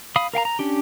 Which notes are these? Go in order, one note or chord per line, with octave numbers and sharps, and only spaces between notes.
F5 B5 D#6
A#4 F5 G5 A#5
A#5
C#4 D4 G4